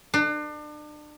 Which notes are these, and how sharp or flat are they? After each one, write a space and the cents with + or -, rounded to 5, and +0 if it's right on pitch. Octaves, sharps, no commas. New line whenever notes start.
D4 +35